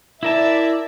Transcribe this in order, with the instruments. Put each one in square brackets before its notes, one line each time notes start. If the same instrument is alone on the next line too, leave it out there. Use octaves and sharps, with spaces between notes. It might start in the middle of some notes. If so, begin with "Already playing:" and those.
[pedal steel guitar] E4 A#4 A5 [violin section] D5 E5